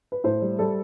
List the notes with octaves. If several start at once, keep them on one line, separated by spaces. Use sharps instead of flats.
B4
A2 C5
G3
G3 A4